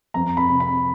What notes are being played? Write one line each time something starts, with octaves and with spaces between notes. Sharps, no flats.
F2 A#5
B5
C3
B5